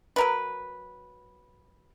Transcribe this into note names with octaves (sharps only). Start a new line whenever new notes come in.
F#3 A#4 B4